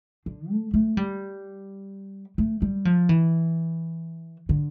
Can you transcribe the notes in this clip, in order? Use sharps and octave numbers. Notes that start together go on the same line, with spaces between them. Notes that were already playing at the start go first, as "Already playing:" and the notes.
D3
A3
A3
G3
A3
G3
F3
E3
D3